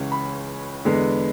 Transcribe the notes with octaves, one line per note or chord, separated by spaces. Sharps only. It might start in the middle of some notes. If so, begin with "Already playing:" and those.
Already playing: C#2 C#3 E3 G#3 C#4
B5
E2 D3 G#3 B3